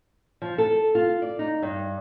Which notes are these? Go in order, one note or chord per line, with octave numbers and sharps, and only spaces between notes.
F3
A4
F4
D5
D#4
G2